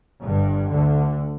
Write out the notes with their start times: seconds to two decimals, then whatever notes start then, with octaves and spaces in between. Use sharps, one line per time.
0.24 G1 G2
0.70 D2 D3